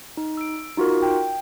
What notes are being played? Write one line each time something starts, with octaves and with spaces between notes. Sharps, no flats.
D#4
E6 D7
D#4 F4 F#4 A#4
G5